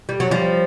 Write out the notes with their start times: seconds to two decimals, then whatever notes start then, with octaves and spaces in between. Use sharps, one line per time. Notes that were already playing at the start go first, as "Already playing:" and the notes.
0.09 G3
0.20 F#3
0.31 F3 G3